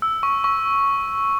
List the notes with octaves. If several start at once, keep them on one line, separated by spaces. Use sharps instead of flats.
E6
C#6
C#6